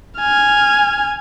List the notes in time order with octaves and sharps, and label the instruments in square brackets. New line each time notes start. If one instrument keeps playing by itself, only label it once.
[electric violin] G#5 F6